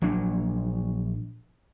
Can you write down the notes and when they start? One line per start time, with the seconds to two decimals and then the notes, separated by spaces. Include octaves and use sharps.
0.02 A#1 A#2 F#3 D4